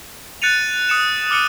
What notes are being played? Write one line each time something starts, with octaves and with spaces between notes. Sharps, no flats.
F#6 A6 C#7 D#7 F7
D#6 C#7 E7
D6 F6 C#7 D#7